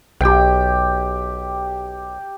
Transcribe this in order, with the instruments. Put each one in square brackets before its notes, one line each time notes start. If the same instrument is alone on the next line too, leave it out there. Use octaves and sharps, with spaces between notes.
[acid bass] B1 [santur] G4 G5